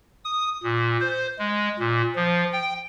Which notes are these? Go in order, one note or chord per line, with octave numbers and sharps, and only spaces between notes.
D#6
A#2
C5
G#3
A#2
F3
G5